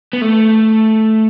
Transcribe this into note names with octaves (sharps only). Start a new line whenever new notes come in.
B3
A3